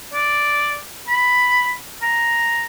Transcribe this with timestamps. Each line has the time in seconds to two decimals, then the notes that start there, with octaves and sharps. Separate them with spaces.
0.14 D5
1.08 B5
2.02 A#5